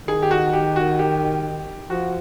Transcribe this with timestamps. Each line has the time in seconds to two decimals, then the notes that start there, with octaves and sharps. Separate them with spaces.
0.07 D#3 G#4
0.22 G4
0.31 F#4
0.53 G4
0.76 F#4
0.99 G4
1.90 F3 F#4